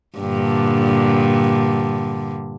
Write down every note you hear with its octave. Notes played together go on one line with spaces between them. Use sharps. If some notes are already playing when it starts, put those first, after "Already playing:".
G2 A#2 D3